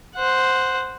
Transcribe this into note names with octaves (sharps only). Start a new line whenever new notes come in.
C5 F#5